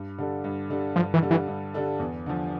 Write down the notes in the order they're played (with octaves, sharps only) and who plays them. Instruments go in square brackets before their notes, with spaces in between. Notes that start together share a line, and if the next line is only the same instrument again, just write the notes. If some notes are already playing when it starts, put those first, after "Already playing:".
Already playing: [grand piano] G2
D3 G3 D4 A4
G2
D3 G3 D4 A4
[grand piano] G2 [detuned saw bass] F3
[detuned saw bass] E3
[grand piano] D3 G3 D4 A4
[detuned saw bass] E3
[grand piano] G2
D3 G3 D4 A4
E2
D3 F3